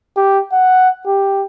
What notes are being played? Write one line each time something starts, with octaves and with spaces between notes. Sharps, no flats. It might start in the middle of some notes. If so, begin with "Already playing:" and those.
G4
F#5
G4